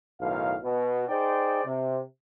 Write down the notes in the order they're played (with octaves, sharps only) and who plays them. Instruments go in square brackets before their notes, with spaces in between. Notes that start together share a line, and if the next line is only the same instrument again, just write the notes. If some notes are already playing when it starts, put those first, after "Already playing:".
[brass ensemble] B1 A2 D#3 F5
B2
D#4 G#4 C5 D5 G5
C3